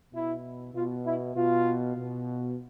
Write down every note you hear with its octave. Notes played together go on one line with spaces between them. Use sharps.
B2 E4
B2 F4
E4
B2 F4
B2